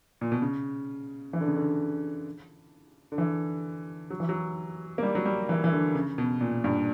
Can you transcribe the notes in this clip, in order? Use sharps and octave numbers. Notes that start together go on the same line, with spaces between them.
A#2
B2
C#3
E3
D3
C#3
D3
D3
E3
F#3
E3
F#3
A#3
G3
F#3
G3
E3
E3
D3
C#3
B2
A#2
G2